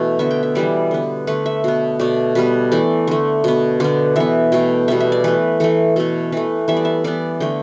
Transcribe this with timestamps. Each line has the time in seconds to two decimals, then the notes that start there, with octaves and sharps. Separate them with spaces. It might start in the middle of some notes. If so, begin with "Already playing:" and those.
Already playing: B2 E3 A3
0.19 D3 B3 E5
0.31 G5
0.43 E5
0.55 E3 G3 B3 D5
0.91 D3 B3
1.27 D3 A3 B4
1.46 E5
1.64 B2 B3
1.99 B2 A3 D5
2.35 B2 G3 B3 B4
2.72 E3 A3 D5
3.07 D3 A3
3.44 B2 B3
3.80 D3 B3 D5
4.16 E3 B3 E5
4.52 B2 A3 G5
4.88 B2 G3 B3 E5
5.00 E5
5.12 D5
5.24 E3 A3 B4
5.60 E3 A3 A4
5.96 B2 A3 A4
6.32 E3 A3 B4
6.68 E3 G3 B3 E5
6.77 D5
6.85 E5
7.04 E3 B3 D5
7.40 D3 A3 G5